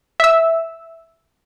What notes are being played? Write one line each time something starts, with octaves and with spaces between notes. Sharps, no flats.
E5 E6